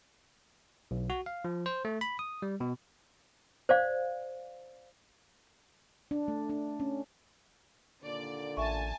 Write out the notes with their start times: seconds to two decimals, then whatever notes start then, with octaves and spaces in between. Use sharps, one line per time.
0.91 B1
1.10 F#4
1.26 F5
1.45 F3
1.66 C5
1.85 A3
2.01 B5
2.19 D#6
2.42 G3
2.60 B2
3.69 C5 D5 F5
6.11 D4
6.28 A3
6.50 D4
6.80 C#4
8.03 D#2 A#2 D3 D5
8.57 A1 E5 G#5 A5 C#6